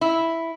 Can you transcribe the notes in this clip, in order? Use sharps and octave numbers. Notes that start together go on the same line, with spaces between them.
E4